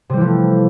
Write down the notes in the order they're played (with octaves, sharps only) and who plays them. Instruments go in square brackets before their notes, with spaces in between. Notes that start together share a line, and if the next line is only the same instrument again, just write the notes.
[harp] C3
G3
E3
F3
A3